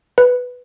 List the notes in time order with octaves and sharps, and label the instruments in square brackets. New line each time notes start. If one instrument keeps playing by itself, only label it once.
[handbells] B4